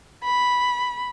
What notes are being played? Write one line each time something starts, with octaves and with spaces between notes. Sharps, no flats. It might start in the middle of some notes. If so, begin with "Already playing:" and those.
B5